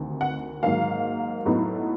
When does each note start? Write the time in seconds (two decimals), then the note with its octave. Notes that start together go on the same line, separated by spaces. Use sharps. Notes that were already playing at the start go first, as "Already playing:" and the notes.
Already playing: D2 C3 D#3
0.21 F#5
0.63 G#2 D#3 F#3 A#3 F5
1.45 A2 F#3 B3 D#4